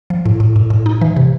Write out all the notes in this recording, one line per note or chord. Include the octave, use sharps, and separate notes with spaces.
F3
A2
A2
A2
A2
D#4
E3
C3